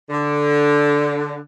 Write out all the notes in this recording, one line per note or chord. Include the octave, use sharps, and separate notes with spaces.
D3